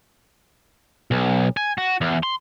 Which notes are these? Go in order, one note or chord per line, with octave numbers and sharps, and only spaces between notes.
B1
G#5
F#4
E2
C6